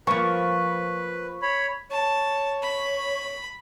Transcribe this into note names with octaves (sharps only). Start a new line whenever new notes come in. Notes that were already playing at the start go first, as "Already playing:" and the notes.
F3 A#3 B4 C#6
C#5 B5
C#5 A5
B5